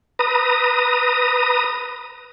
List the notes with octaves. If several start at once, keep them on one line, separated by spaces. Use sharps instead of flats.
B4 A#5 D#6